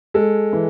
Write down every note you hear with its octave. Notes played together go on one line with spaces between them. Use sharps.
G#3 A4
E3